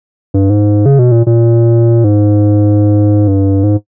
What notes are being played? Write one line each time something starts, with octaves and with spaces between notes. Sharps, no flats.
G2
G#2
C#3
B2
A#2
A#2
G#2
G2
G#2